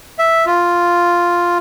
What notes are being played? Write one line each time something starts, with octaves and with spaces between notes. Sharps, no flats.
E5
F4